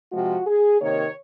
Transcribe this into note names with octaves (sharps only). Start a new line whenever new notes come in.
C3 F3 G#3 F#4
G#4
C3 D#3 A#3 C#5